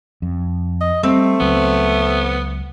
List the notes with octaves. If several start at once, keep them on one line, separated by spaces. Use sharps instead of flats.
F2
D#5
G3 A3 C4
C#2 F#3 B3